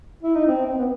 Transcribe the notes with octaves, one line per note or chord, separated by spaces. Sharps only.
E4
D#4
C4
C4
B3